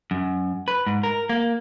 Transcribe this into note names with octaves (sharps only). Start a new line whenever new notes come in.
F#2
B4
G#2
A#4
A#3